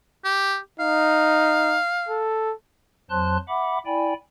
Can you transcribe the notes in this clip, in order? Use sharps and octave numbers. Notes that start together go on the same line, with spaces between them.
G4
D#4 F5
A4
F2 F#3 C5 A5 C6 F#6
E5 F#5 B5 D6
E4 D5 G5 G#5 B5